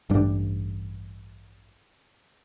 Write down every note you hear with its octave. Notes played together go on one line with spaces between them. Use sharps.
A1 G2 G3 D4